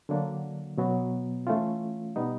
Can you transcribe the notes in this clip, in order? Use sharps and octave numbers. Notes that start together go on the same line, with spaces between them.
D3 F#3 A#3 D4
B2 F#3 B3
E3 A3 C#4 F4
B2 G3 B3 D#4